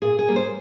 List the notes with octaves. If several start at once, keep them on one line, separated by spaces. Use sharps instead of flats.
A#2 G#4
G#4
G3 A#3
C5